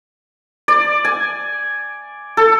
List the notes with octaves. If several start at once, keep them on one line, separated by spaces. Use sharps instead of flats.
D5
G#5
A4